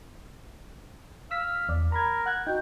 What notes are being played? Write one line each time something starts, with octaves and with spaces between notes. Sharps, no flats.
F5 E6 B6
E2 D5
A#4 A#5 B5 G#6
F#5 F#6 G#6
D#4 F#4 G5